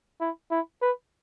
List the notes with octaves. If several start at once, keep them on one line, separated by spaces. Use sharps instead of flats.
E4
E4
B4